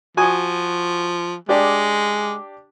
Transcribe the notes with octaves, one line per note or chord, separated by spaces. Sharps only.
F3 F#4 G#5 D#6
G#3 D4 G4 D5